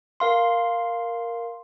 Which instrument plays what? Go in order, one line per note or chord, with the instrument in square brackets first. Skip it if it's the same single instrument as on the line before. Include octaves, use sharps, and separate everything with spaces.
[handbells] A#4 F5 C6